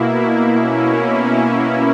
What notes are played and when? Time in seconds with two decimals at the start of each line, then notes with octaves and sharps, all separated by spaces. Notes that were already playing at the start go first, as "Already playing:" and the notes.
Already playing: B2 A#3 E4
0.58 B2 A#3 C#4 E4